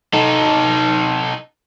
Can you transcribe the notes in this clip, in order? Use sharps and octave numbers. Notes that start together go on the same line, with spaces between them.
D#4 A4